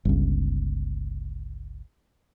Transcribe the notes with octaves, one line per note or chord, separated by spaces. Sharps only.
G1 C#2